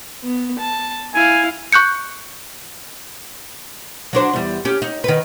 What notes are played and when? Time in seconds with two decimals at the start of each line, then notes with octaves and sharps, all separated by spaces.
0.23 B3
0.59 A5
1.14 E4 F5 G#5
1.72 C#6 F#6 G6 C#7
4.13 F#3 D4 C5
4.33 E2 G3
4.65 C#4 G4
4.82 D#4
5.04 D#3 B4